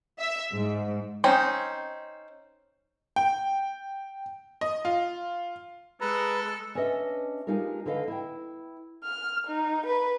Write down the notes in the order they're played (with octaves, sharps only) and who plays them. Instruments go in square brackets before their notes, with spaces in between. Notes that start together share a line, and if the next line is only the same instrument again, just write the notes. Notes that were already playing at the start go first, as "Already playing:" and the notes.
[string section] E5
G#2
[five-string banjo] C4 C#4 D#4
[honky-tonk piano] G5
D#5
F4
[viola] G#3 [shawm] A4 [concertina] B4 A#5
[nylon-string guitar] C#4 D4 B4 D#5 E5
G#3 D4 D#4 F4 G4 A#4
D3 A4 B4 D#5 F5
E4 G5
[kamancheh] F6
D#4
B4